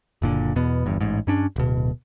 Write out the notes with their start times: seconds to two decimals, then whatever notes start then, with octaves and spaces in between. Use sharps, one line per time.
0.22 F#1 A#2 D3
0.56 E2 B2 B3
0.86 G1 E2 G2
1.01 A1 G#2
1.27 G2 C#4 D4
1.56 D1 B2